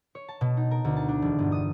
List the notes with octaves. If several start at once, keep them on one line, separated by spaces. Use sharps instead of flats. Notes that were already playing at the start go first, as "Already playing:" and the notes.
C#5
A5
B2
D#4
A#4
D2
A5
D4
E1
G1
D#6